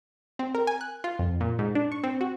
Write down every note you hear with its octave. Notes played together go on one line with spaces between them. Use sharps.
C4
A#4
G#5
F#6
F4
F2
A#2
G#2
D4
C#6
C4
F#4